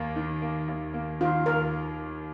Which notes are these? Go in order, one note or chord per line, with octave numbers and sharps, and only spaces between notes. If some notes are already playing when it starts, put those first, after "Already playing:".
Already playing: D#2 A#3
D#3
A#3
D#2
A#3
D#3 F4
D#2 A#4